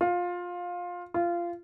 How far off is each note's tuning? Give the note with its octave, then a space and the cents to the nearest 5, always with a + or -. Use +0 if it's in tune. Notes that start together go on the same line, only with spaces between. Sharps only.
F4 +20
F4 -15